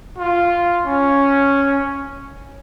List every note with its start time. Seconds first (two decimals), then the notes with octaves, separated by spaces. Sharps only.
0.17 F4
0.86 C#4